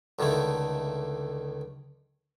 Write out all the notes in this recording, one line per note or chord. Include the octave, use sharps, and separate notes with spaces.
C#2 D3 D#3 A3 E4